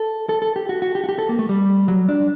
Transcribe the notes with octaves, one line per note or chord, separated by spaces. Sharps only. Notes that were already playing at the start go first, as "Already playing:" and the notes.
Already playing: A4
A4
A4
G4
F#4
F#4
G4
F#4
G4
A4
A#3
A3
G3
F#3
D4